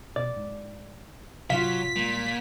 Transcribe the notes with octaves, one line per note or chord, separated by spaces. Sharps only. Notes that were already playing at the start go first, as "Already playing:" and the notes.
B2 D5
G#2
G#2 C3 F#3 F4 F5 B6
A#2 G3 G#3